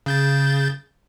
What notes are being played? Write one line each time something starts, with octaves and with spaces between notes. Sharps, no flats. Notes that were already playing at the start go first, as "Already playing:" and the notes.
C#3 G6 A6